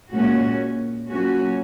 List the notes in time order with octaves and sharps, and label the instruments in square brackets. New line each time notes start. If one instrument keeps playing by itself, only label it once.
[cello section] A#2 G#3 C#4 F#4
A#2 F#3 C#4 F#4